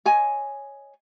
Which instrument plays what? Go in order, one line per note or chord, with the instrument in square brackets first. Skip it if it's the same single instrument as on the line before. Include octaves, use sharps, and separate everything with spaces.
[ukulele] C#5 D#5 G#5